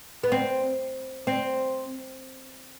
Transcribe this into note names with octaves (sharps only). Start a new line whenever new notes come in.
B3
C4
C4